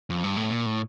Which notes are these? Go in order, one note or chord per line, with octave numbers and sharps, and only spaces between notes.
F2
G2
A2
A#2
A2